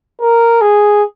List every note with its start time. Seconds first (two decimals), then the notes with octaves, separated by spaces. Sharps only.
0.21 A#4
0.61 G#4